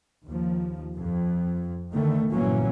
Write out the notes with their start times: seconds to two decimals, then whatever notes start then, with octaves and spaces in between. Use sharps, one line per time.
0.24 D#2 F3
0.97 F2
1.91 D3 D#3 A3
2.32 G1 A#2 E3 F#3 A#3 C#4